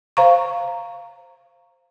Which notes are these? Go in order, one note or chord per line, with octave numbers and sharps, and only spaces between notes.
C5 F5 A#5 C#6